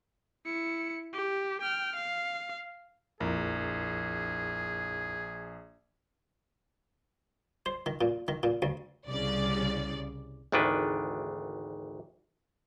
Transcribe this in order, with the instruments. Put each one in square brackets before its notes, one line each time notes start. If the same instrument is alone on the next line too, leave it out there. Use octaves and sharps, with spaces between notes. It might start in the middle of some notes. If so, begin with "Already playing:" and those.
[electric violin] E4 C#7
G4
G5 F6
F5
[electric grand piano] A#1 [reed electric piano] F2 E4 A#4 [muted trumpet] G#4
[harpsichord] C5
D#3
A#2
D#3
A#2
D2
[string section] C2 C#3 D5
[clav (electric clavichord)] G#1 D2 D#3 E3 D4 B4